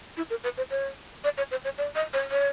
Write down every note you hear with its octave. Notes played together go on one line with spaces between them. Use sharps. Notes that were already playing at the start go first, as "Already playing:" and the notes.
E4
A#4
B4
C5
C#5
D5
C#5
C5
C#5
D5
D#5
C#5
C#5